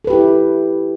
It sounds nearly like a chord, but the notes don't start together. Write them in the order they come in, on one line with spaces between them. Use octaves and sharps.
A4 B4 G4 E4